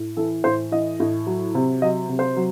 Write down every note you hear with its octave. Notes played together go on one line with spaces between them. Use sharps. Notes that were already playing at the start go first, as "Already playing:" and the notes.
Already playing: A2
E3 A4
A2 C5
E3 D#5
A2
F#3
C3
F#3 D#5
C3
C5
F#3